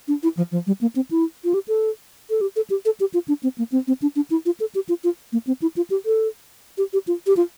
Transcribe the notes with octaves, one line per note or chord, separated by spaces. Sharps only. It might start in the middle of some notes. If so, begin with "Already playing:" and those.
D4
E4
F3
F3
G3
A#3
C4
E4
F4
G4
A4
A4
G4
A4
G4
A4
G4
F4
D4
C4
A#3
C4
C4
D4
D4
E4
F4
A4
G4
F4
F4
A#3
C4
E4
F4
G4
A4
G4
G4
F4
G4
F4